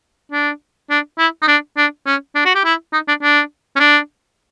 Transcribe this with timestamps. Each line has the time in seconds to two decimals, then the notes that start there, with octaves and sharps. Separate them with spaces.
0.32 D4
0.90 D4
1.18 E4
1.42 D#4
1.48 D4
1.77 D4
2.06 C#4
2.35 D4
2.45 F#4
2.55 G4
2.65 E4
2.93 D#4
3.08 D4
3.23 D4
3.76 C#4
3.80 D4